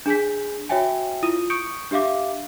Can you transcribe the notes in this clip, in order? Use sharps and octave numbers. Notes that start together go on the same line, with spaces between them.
D4 G#4 G#5 G6 B6
F#4 C#5 E5 G5 G#5
E4 F4 D#6 D#7
C#6 D#6 G6 C#7 D7
D4 G4 E5 F5 D6